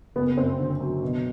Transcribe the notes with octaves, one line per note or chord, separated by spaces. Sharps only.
F#1 B3
F#2 C4
D3
F#3
B2